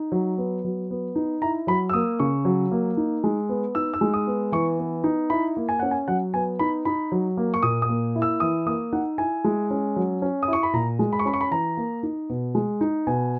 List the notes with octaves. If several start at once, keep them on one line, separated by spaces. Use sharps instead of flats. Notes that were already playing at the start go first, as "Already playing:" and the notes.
Already playing: D#4
F#3
B3
F#3
B3
D#4
E4 A#5
F#3 B5
E6
A#3 D#6
C#3 C#6
F#3
A#3
D#4
G#3
B3
D#4 E6
E6
G#3
D#6
B3
E3 C#6
B3
D#4
E4 B5
A#3
G#5
C#4 F#5
G#5
F#3 F#5
B3 G#5
D#4 B5
D#4 B5
F#3
A#3
C#6
A#2 D#6
D#6
A#3
E4
E6
E3 D#6
A#3 D#6
D#4 F#5
E4 G#5
G#3
C#4
F#3
C#4
D#6
E4
C#6
B5
A#2 A#5
G#3
B5
C#6
C#4 B5
C#6
B5
E3 A#5
A#3
D#4
B2
G#3
D#4
B2 G#5